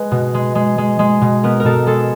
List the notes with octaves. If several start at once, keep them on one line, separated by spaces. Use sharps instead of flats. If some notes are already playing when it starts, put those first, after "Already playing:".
Already playing: G#3 B4
B2
G#3
G#3
G#3
G#3
B2
B3 A#4
A#4
B2 A4
G#3 A4